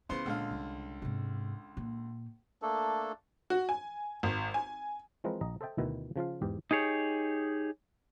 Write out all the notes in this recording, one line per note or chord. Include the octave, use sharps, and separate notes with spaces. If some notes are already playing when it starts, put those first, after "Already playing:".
C#3 B3 E4 F4 C5
C#2 A#2 D3 F5
C2
G#2 C3
A#2
A3 A#3 D4 A4
F#4
G#5
G#1
G#5
E3 F3 G#3 C4 A#4 B4
A#1 D#5 A#5
A4 C5 D#5 E5 G5 A5
D2 B2 D#3 E4
C#3 F3 F4 F5
E2 G#2 G4
D#4 G4 G#4 C#5